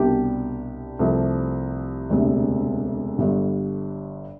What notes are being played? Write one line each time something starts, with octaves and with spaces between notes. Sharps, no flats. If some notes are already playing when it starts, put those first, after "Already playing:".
Already playing: C2 B2 G3 D4 G4
C2 C3 F3 A3
E1 D2 C3
G1 G2 D3